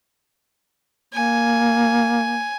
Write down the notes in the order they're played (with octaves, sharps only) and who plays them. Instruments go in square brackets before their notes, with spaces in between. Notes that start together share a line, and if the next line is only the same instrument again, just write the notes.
[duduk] A#3 [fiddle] G#5